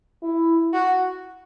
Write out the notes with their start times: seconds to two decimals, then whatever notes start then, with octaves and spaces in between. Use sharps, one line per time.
0.23 E4
0.74 F#4